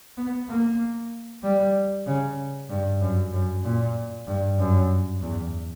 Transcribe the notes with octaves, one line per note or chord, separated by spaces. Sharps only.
B3
A#3
G3
C#3
G2
F#2
F#2
A#2
G2
F#2
E2